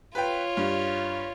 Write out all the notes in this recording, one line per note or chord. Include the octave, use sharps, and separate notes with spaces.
F4 B4 C#5 G5
G2